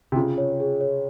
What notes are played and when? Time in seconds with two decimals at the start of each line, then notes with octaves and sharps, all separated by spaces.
0.12 C3
0.16 C#3 F4
0.38 C#5
0.60 G#4
0.81 C#5